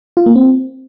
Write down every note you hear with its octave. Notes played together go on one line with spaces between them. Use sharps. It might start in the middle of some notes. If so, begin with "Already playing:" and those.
F4
A#3
C4